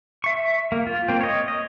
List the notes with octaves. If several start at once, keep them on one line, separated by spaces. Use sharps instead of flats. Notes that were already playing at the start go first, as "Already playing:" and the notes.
E5 C#6
A#3
F4
A#3 C4
C#5 D#5
D#5